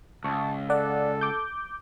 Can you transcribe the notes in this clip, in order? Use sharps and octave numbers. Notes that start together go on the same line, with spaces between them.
C#2 A5 C#6
A4 D5 F#5
D6 G6